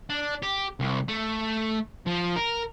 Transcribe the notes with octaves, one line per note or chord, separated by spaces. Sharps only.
D4
G4
C2
A3
F3
A#4